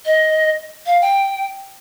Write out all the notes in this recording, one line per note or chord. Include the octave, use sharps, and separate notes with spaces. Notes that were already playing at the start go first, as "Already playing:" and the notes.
D#5
F5
G5